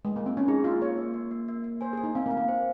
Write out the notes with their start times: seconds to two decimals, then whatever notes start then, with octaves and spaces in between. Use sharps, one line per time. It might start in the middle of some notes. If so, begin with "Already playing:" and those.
0.05 G#3
0.16 A#3
0.26 C4
0.37 C#4
0.48 D#4 G#4
0.64 A#3 F4
0.81 A#3 C#5
0.98 A#3
1.14 A#3
1.31 A#3
1.48 A#3
1.64 A#3
1.81 C5 G#5
1.93 G#4
1.98 G#5
2.04 D#4
2.15 C4 F5
2.26 A#3
2.31 F5
2.37 A#3
2.48 C5